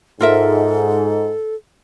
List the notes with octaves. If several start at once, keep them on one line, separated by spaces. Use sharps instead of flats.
G#2 F4 A4 A#4 E5